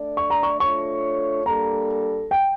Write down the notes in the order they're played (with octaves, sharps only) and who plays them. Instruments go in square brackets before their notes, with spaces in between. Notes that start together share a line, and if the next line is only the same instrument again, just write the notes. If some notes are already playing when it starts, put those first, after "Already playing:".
Already playing: [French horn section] A3 D4 A4 D5
[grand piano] C#6
A#5
C#6
[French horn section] A3 D4 F4 A4 C#5 [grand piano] C#6
[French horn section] G3 A#3 D4 A4 [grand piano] A#5
[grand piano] G5